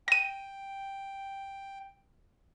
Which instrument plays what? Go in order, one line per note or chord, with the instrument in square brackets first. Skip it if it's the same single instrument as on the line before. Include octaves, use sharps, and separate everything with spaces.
[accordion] G5 [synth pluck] A#6 D#7